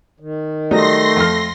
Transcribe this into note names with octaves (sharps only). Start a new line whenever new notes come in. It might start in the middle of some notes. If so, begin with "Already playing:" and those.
D#3
F#3 G3 A3 D#4 C6 A#6
F2 A4 F6